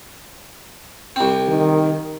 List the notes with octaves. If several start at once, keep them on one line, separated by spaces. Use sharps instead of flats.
C2 C4
D#3